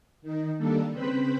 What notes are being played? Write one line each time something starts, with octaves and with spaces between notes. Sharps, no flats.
D#3 D#4
D#3 G3 A#3 D4 A4
C#3 C4 B4 C5 B5